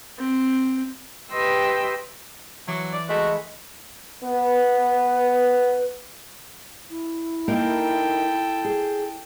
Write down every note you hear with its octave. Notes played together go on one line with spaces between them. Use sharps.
C4
G4 B4 D#5 G5 C6 E6
E3 F#3 D6
D5
G#3 A3 F#4 B5
B3 B4
E4
A#3 D#4 A4 A#4 G5
G#4